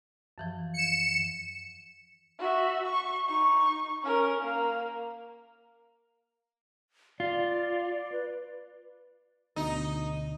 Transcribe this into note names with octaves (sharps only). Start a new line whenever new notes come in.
F#2 E3 F3
C#7 E7
F#4 E5
C#6
D#4 C#6
C#4 A#4
A#3
F4 D5
B4
D2 B2 D3 D#4